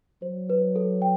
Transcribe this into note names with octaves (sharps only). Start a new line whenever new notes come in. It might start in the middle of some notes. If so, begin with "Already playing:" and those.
F#3 C5
B4
A4
G5